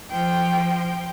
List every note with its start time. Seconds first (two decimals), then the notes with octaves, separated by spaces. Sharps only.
0.10 F3 G5